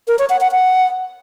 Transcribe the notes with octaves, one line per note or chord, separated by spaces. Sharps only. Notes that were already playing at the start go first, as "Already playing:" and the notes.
A#4
C#5
F#5
F#5
F#5